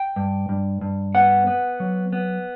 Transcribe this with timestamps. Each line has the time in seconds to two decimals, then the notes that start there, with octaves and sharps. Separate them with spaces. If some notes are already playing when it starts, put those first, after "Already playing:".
Already playing: G5
0.16 G2
0.49 G2
0.81 G2
1.15 B3 F#5
1.47 B3
1.80 F#3
2.13 B3